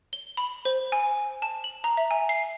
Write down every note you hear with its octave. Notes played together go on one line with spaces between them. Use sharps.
G7
B5
C5
G#5
A5
F#7
A#5
E5
G#5
C7